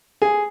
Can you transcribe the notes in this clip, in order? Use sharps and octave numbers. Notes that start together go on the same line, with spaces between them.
G#4